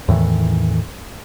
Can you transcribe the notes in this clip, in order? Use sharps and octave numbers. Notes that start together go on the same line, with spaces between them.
E2 A2 D#3 E3